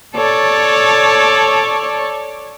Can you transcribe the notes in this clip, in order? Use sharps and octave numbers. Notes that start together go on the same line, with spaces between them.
A4 C#5 D5